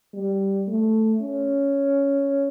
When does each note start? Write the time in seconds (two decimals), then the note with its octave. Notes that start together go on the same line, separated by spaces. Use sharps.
0.14 G3
0.68 A3
1.21 C#4